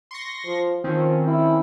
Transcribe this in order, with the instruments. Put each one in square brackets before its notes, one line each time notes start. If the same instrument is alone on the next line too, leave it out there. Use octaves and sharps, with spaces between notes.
[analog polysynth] C6 C#6 A#6
[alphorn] F3
[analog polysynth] D#3 C4 C#4 [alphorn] F3
[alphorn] E4